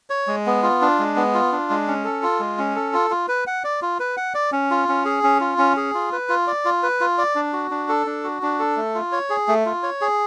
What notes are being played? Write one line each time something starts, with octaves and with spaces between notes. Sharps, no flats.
C#5
G#3
B3
F4
D4
G#3
B3
F4
D4
G#3
C#4
A4
F4
G#3
C#4
A4
F4
F4
B4
F#5
D5
F4
B4
F#5
D5
C#4
F4
C#4
G#4
C#4
F4
C#4
G#4
F4
B4
F4
D5
F4
B4
F4
D5
D4
F#4
D4
A4
D4
F#4
D4
A4
A3
F4
C#5
G#4
A3
F4
C#5
G#4